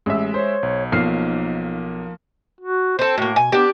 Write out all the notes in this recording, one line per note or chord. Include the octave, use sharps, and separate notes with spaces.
A1 G#3 E5 E6
C5 C#5
B1
B1 F3 A#3 D#4 F6 C7
F#4
C4 A4 C5
A2 A#3 F#4
B2 G#5
B3 D4 G4